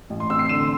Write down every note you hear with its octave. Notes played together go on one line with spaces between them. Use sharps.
A1
C6
C4 E6
C7
D3 E7